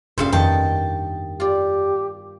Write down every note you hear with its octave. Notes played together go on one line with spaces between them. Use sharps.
E1 G2 A#2 C#3 C5 E5 F5
F2 D#3 A#3 B3 G5 A5
F4 G4 D5